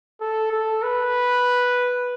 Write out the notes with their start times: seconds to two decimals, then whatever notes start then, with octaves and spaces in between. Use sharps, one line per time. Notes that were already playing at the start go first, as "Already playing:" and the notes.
0.21 A4
0.52 A4
0.83 B4